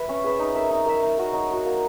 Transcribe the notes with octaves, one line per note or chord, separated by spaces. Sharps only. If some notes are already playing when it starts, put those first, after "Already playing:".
Already playing: B4 E5
C#4
G#4 B4 E5
D#4
A#4 E5
D#4
A#4 E5
D#4
F#4 A#4
D#4
F#4 A#4
A#3